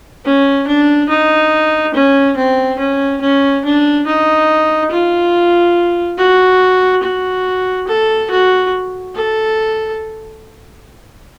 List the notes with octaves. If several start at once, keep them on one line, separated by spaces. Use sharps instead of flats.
C#4
D4
D#4
C#4
C4
C#4
C#4
D4
D#4
F4
F#4
F#4
A4
F#4
A4